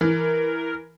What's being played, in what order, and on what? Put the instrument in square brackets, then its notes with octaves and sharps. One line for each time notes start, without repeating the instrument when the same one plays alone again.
[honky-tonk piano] E3 [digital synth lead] A#4